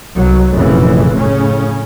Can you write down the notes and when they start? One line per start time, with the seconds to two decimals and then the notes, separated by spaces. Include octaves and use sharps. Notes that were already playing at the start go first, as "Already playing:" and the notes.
0.14 C2 F#3
0.51 F1 F#2 A#2 C#3 E3
1.15 A2 C#3 C#4